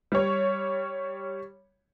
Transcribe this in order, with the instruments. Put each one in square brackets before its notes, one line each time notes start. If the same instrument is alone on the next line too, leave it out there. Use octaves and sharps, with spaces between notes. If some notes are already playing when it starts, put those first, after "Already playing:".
[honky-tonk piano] G3 C#5